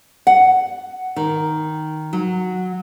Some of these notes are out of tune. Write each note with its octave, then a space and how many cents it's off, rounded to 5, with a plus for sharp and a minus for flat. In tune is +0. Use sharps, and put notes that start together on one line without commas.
F#5 +5
D#3 +0
F#3 -10